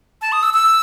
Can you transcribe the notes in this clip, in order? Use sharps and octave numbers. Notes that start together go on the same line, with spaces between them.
A5
D#6
E6
E6